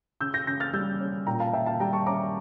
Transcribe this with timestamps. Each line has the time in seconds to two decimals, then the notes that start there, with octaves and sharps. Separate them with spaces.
0.21 C#3 E6 G6
0.34 G6 A#6
0.47 C#3 G6 A#6
0.60 F6 A6
0.73 G3 E6 G6
1.00 C#4
1.27 A#2 G5 A#5
1.40 F5 A5
1.53 A#2 E5 G5
1.66 F5 A5
1.80 G3 G5 A#5
1.93 A5 C#6
2.06 C#4 A#5 D6